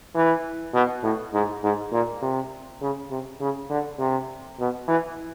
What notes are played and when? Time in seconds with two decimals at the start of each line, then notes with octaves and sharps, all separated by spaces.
0.15 E3
0.73 B2
1.03 A2
1.33 G#2
1.63 G#2
1.92 A#2
2.22 C3
2.81 C#3
3.11 C3
3.40 C#3
3.70 D3
3.99 C3
4.59 B2
4.88 E3